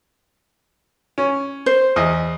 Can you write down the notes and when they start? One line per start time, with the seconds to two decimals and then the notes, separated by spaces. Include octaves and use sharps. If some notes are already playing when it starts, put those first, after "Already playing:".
1.18 C#4
1.66 C5
1.96 E2 D#5